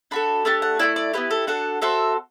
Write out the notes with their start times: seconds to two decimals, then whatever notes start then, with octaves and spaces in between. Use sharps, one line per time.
0.11 D4 F#4 A4 B5
0.45 A3 D4 G4 A5
0.62 F#5
0.79 A3 C4 E4 D5
0.96 D5
1.13 B3 E4 G4 B4
1.31 A4
1.47 D4 F#4 A4 F#5
1.82 C4 F#4 A4 E5